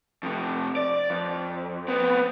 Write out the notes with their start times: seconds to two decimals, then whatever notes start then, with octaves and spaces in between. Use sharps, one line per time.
0.23 F2 C3
0.76 D5
1.10 F2
1.88 B3 C4